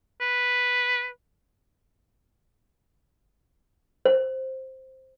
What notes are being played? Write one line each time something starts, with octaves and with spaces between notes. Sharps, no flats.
B4
C5